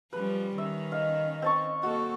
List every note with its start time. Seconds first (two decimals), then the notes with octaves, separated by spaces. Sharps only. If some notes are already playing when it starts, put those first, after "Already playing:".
0.13 F3 G3 C#4 B4
0.58 D#3 C#4 E5
0.92 D#5 F5
1.42 C4 A5 C#6
1.83 A#3 F#4 A4